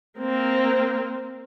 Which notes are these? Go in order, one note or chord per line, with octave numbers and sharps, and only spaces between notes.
A#3 C4